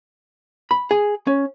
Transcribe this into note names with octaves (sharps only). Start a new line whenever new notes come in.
B5
G#4
C#4